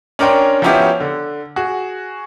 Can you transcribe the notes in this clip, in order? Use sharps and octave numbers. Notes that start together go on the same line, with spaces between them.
C#4 D4 A#4 C#5 G5 C6
F3 F#3 B3 C#4 E4 G4
D3
F#4 G#4